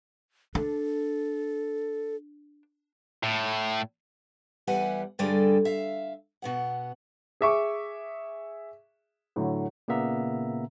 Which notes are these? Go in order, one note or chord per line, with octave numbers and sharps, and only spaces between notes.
D4 A4
A2
E2 G3 B4 E5 F#5 G#5
G2 D3 G3 G#4 A4 D5
E5 F5
B2 B3 F#5
G#4 E5 C#6 D6
A2 D3 F#3
A#2 C#3 A#3 B3 E5 A#5